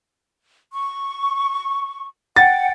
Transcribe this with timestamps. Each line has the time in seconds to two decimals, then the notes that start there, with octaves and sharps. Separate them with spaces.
0.73 C#6
2.36 F#5 G5 A6